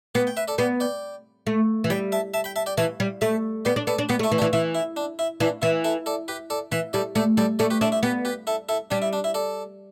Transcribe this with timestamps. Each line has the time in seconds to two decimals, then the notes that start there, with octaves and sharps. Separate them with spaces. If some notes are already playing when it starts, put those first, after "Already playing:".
0.15 B3 G4 B4
0.27 G5
0.37 B4 E5
0.48 A4 D5
0.58 B3 D5 G5
0.80 D5 G5
1.47 A3
1.84 E3
1.90 G3 G5 B5
2.12 E5 A5
2.34 E5 A5
2.44 G5 B5
2.56 E5 A5
2.66 D5 G5
2.78 E3 E5 A5
3.00 G3
3.21 A3 E5 A5
3.65 B3 D5 G5
3.76 D4
3.87 B3 A4 D5
3.98 D4
4.09 B3 G4 B4
4.19 A3
4.23 E4 A4
4.32 E3
4.38 D4 G4
4.42 E3
4.53 E3 E4
4.75 E4
4.97 D4
5.19 E4
5.40 E3 D4
5.62 E3 E4
5.84 E4 A4
6.06 A4 D5
6.28 G4 B4
6.50 A4 D5
6.72 E3 B4 E5
6.93 G3 A4 D5
7.15 A3 A4 D5
7.37 G3 A4 D5
7.59 A3 A4 D5
7.70 G4 B4
7.81 D4 E4 A4
7.92 E4
8.03 B3 G4 B4
8.25 G4 B4
8.47 E4 A4
8.69 E4 A4
8.91 G3 D4 G4
9.02 E4
9.13 D4
9.24 E4
9.34 A4 D5